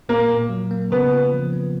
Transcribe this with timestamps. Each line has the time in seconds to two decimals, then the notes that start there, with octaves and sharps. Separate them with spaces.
0.09 A#2 A#3
0.30 A#2
0.49 F#3
0.71 A#3
0.91 C#3 B3
1.12 F4
1.33 F3
1.53 B3